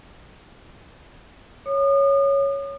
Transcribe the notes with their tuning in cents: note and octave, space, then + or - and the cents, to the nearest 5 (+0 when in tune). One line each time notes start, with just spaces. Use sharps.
C#5 +0 D#6 -40